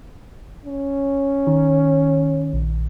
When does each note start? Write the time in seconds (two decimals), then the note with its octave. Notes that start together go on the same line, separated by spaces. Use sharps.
0.66 C#4
1.47 D#3
2.53 A#1